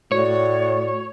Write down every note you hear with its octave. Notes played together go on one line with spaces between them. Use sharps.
A2 F#4 C#5 D5